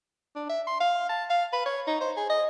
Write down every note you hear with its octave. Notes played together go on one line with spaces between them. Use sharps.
D4
E5
C6
F5
A5
F5
B4
C#5
D#4
C5
G#4
D#5